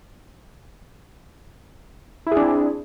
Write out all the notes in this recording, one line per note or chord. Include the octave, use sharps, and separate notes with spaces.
C4 D4 E4 G#4